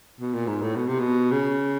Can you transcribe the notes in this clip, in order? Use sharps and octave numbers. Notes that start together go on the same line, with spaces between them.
B2
A#2
G#2
A2
B2
C3
B2
C#3